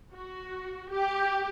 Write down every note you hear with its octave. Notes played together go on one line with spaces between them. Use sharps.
F#4
G4